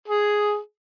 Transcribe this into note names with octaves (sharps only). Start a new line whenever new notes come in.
G#4